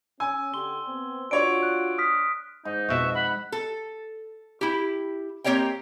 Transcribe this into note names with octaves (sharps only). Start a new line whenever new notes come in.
C#4 G#5 E6
D3 G4 C6 G7
B3 C4
D4 F4 F#4 C#5 D5 D7
F#6
D#6 F6 B6
G#2 D#4
F2 B2 F#4 E5
F#5 B5
A4
E4 G4
A#3 C4 G4 C#5 D#5 G5